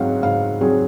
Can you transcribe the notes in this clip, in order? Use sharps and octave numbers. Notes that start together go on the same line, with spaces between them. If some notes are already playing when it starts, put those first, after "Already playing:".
Already playing: G#2 F#3 C4 F5 F#5
G#2 F5
F#3 C4 G#4